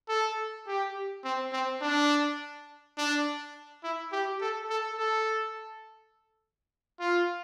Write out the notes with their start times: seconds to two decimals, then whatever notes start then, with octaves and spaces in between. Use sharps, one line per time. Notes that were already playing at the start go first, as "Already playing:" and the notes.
0.09 A4
0.67 G4
1.24 C4
1.53 C4
1.81 D4
2.98 D4
3.84 E4
4.12 G4
4.41 A4
4.70 A4
4.98 A4
7.00 F4